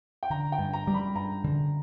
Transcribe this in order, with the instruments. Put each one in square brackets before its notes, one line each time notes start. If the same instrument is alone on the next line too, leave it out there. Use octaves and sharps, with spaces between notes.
[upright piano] G5
[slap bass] D3 [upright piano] A#5
[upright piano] G5
[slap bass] G2
[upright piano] A#5
[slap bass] G3
[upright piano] B5
[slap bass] G2 [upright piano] A#5
[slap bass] D3